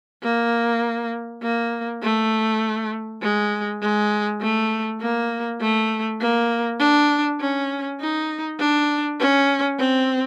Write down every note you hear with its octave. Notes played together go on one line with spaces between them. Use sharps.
A#3
A#3
A3
G#3
G#3
A3
A#3
A3
A#3
D4
C#4
D#4
D4
C#4
C4